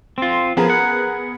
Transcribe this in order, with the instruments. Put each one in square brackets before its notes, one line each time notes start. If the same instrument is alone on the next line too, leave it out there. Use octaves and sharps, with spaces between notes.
[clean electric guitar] C4 F4
[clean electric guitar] F3 [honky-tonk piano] B3 G#4 A#4
[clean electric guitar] F#5